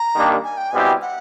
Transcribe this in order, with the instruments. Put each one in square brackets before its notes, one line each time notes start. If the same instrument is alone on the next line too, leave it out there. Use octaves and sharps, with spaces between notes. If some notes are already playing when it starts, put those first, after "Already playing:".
Already playing: [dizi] A#5
[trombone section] D#3 G3 A#3 D4 G4
[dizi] G#5
G5
[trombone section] B2 G3 C4 E4 G4 [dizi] G#5
[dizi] F#5